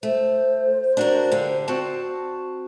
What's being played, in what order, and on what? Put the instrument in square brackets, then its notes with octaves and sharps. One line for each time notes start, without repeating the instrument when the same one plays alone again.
[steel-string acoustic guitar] A3 [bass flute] C5
[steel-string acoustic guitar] D4 F#4 A#4
D3 G4 F5
C4 F#4 A5